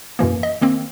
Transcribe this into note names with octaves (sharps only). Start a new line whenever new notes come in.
F#2 B2 E3 A#3
D#5
D#3 A#3 C4